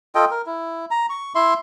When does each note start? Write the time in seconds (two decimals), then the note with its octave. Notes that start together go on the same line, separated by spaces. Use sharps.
0.15 F4 A4 D#5 G5
0.31 A#4
0.46 E4
0.91 A#5
1.10 C#6
1.35 E4 E5 C6